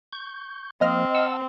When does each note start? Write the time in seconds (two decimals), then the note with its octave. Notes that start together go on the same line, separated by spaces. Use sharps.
0.13 C#6 G6
0.81 F3 A#3 C4 D#5 F6
1.15 F#5 A5 E6